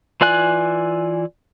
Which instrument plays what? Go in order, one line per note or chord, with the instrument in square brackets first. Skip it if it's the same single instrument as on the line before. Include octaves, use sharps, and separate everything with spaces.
[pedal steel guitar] E3 F4 D5 G#5 F#6